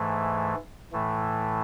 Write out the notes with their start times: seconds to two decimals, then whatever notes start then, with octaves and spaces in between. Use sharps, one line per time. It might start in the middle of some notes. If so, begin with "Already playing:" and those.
Already playing: G#2 E3 A3
0.93 A2 E3 A3